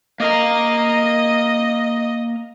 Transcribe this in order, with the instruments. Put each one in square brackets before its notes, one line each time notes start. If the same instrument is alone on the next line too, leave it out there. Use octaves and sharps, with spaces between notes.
[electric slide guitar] A#3 A#4 A#5 [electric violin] D#5